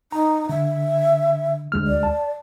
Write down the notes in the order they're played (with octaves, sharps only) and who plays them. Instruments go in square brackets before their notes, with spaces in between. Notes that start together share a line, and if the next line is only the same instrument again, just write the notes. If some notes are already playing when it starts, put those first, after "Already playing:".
[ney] D#4 [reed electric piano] A#5
[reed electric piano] D3 [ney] E5
[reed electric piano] D2 G#3 F6
[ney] D5
[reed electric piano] A5